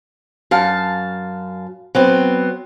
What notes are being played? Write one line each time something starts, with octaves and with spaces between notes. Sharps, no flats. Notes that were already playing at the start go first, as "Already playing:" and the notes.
F#2 F5 A5
F#3 B3 C4